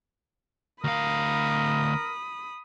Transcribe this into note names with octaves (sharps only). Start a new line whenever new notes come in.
D2 A#4 F5 B5 D#6